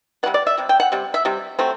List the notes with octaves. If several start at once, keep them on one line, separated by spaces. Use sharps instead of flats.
C3 G3 B3 F#5
D5
E5
C3 G3
G5
F#5
C3 G3
E5
C3 G3
F#3 A3 C4